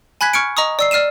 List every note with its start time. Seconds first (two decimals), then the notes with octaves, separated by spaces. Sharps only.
0.21 G#5 B5 F#6 G#6 B6
0.33 C#6 F6 G#6 C#7 D7
0.57 D#5 A#5 C#6 D#6
0.79 D5 E6 C7
0.91 D5 F6 C7 D#7 E7